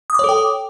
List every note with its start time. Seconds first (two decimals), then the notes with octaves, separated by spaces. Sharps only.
0.10 D#6
0.14 D6
0.19 C#5
0.24 A4
0.29 G5